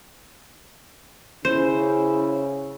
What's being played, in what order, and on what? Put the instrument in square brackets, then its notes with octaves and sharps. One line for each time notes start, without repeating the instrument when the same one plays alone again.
[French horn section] C#3 [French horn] C#4 [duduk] E4 [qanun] C5